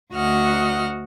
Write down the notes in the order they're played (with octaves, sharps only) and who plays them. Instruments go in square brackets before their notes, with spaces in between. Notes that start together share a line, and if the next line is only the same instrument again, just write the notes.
[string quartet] D2 F#4 D#5 F#5 F6